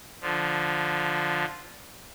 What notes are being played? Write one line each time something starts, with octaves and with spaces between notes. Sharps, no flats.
D3 F3